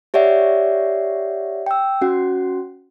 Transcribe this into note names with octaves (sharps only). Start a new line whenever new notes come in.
G4 C#5 D5 E5 F#5
G5 E6
C#4 F#4 F#5